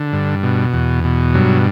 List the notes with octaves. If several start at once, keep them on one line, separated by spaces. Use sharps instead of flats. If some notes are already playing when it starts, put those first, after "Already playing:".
Already playing: D3
G2
B2
E2
B2
G2 F#3